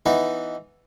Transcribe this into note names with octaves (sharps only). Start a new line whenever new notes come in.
E3 B3 D#4